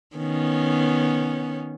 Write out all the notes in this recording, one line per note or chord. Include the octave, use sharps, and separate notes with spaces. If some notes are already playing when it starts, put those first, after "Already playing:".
D#3 B3 C#4